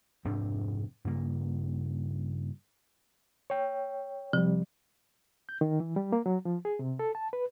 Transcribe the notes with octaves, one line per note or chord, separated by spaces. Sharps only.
F1 G#2 C4 D4
G2 C#3 A#3
C#5 G5
C3 F3 G3
G6
D#3
E3
G3
A#3
F#3
F3
G#4
C3
A4
A5
B4